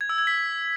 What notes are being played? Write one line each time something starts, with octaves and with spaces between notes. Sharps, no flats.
G#6
E6
G#6
B6